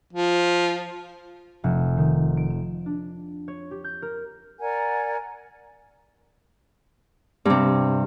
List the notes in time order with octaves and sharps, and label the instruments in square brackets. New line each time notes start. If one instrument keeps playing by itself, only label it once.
[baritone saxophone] F3
[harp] F1
D#3
D7
E7
D4
C#5
G4
G6
A#4
[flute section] A#4 D5 F#5 G#5
[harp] G2 C3